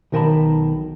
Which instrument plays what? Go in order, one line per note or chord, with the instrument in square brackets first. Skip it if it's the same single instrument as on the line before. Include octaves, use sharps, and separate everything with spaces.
[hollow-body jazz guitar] B1 D#3 A#4 G5 A5 B5